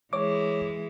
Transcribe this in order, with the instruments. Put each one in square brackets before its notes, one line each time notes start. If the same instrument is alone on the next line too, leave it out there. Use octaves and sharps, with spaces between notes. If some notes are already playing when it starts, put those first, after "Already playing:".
[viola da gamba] E3 G#3 [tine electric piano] C#5 D6